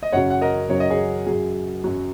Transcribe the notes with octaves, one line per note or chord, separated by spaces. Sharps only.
D#5
F#2 C#3 F#3 C#5 F#5
F#5
A#4 D#5
F#2 C#3 F#3 C#5
D#5
G#4 C#5
F#2 F#3 G#4
F#2 F#3